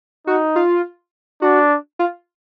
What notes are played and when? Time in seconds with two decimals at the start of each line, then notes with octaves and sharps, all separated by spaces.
0.27 D#4 F#4
0.56 F4
1.42 D4 F#4
1.99 F4